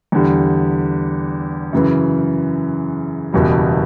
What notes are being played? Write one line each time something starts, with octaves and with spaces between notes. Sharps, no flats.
E2 D3 G3
F#2 C#3 E3
F#1 E2 B2 G3